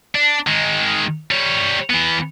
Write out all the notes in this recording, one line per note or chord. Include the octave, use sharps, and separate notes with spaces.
D4
D#3 G#3
G3 C#5
E3 B3